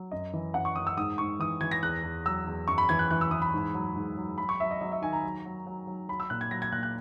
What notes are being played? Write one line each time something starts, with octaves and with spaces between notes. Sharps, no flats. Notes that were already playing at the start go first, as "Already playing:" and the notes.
Already playing: F#3
F#2 D#5
E3
F#2 F#5
C#6
F#2 D#6
E6
G#2 D#6
G#2 C#6
E3 D#6
E3 G#6
A#6
E2 F#6
E2
F#3 E6
E2
F#2 C#6
B5
E3 G#6
F#6
E3 F#6
E6
E3 D#6
B5
G#2
F#3
G#2
F#3
F#3 B5
C#6
F#3 E5
D#5
F#3 D#5
E5
D#3 G#5
A#5
F#3
F#3
F#3
F#3
F#3 B5
E6
A#2 F#6
G#6
F#3 A#6
G#6
A#2 F#6
F#6